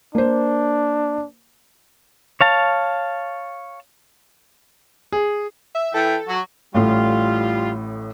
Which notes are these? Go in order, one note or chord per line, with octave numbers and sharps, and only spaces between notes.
A#3 D4 C5
C#5 F5 A5
G#4
E5
E3 A4 E5 G5
F#3 F#4
A1 A2 G3 F4